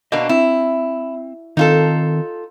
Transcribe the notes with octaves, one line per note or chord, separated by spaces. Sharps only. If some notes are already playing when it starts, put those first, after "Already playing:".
B2 A#3 D4 D#5
C4 E4
D#3 C4 D#4 F4 A4